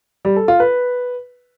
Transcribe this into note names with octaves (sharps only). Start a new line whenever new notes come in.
G3
A4
F4
B4